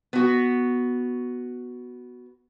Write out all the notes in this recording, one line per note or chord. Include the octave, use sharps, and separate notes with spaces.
B3 F#4